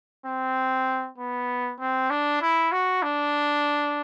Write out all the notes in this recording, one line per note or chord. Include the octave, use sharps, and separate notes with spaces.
C4
B3
C4
D4
E4
F#4
D4